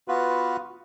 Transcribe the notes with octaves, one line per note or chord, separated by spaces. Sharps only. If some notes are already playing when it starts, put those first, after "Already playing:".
B3 F4 F#4 B4